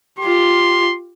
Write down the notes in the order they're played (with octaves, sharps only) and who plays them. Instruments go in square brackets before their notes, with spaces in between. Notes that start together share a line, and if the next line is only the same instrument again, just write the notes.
[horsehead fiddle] F4 G4 [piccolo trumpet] C6